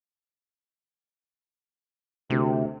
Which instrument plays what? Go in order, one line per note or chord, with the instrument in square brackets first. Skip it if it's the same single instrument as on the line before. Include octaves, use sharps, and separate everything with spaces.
[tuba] D2 [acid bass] C3